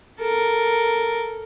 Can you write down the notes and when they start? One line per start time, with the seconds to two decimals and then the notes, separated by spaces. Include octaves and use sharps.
0.20 A4 A#4